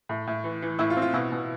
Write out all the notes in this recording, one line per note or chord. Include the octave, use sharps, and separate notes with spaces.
A2
A2
E3
E3
A2 E4
F4
C4
F4
B2 E4
B2